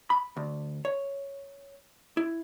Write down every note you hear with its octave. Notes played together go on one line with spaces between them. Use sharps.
B5
D2
C#5
E4